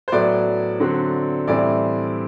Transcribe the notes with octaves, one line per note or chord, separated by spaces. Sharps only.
C5
A2 F#3 B3 D5
D3 F#3 C4
A2 E3 G3 C4 D5